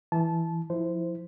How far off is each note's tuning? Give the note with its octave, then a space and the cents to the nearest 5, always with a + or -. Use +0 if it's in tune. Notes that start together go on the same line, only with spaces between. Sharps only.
E3 +0 A5 -20
F3 +0 E4 +0 C5 -15